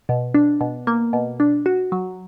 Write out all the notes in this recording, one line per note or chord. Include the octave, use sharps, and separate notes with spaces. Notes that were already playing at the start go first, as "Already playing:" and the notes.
B2
D4
B2
A#3
B2
D4
F#4
F#3